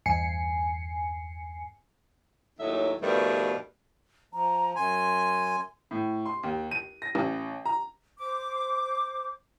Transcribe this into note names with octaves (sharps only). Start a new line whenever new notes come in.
E2 G2 G#5 C7 C#7
D#2 A2 F#3 D#4 C#5 E5
G2 B2 D#3 F3 G3 A3
F3 A#5
F#2 G#5 C6
A2
C6
D#2
D#7
A#6
A1
A#5
C5 D6